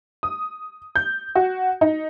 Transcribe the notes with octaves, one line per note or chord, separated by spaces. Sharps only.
D#6
G6
F#4
D#4